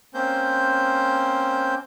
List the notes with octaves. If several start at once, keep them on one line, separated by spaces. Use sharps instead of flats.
A#3 C4 C#4 C5 G6